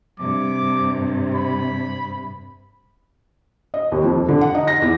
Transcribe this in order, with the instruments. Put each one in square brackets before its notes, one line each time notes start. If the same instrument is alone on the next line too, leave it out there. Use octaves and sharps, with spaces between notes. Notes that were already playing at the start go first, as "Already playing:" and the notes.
[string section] G2 C3 [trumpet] D6
[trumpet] B5
[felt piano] D#5
D#2
F2
D3
F#5
D#4
A#6
E2